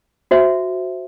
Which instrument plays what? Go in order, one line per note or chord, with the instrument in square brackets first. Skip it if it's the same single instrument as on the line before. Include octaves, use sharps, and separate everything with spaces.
[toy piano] F#4 C5 E5